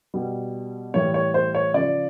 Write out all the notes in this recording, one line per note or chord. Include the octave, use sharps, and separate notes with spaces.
B2 G3
A2 E3 G3 C#5
C#5
C5
C#5
C#3 F3 D5